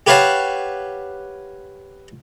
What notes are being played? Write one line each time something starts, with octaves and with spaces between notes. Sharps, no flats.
G4 B4 C#5 F5 F#5 A5